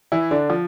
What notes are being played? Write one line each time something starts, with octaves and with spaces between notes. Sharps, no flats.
E3 E4
D3 D4
F3